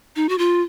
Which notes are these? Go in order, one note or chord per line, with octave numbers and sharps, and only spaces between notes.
D#4
F#4
F4